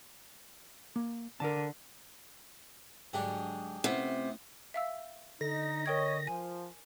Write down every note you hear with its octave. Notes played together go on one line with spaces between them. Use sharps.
A#3
D3 A#4 A5
G#2 D3 F#3 D4 G4 G#4
C3 A3 B3 C#4 E4 F4
E5 F5 E6
D3 D#4 A#6
A#4 C#5 D#5 G5 G#6
F3 G#5